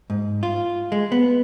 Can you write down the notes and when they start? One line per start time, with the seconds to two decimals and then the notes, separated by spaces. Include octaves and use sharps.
0.10 G#2
0.43 F4
0.92 G#3
1.12 B3